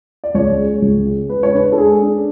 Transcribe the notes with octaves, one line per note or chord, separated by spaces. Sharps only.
D5
C#2 C#5
G#3
C#2
C#3
G#3 B4
C#5
D4 B4
A4
G#3 G#4
D4